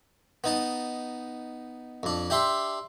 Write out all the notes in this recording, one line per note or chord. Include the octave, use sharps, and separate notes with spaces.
B3 D#4 A5
F2 D4
D4 G4 E5 C6